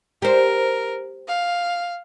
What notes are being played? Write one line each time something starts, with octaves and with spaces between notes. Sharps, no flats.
G4 A#4 C5
F5